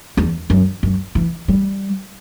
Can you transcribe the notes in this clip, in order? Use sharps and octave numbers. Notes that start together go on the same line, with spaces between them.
E2
F#2
F#2
E3
G3